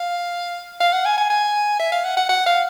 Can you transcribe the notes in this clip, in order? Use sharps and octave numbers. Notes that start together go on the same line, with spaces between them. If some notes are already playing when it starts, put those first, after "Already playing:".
Already playing: F5
F5
F#5
G#5
G#5
G#5
E5
F5
F#5
F#5
F#5
F5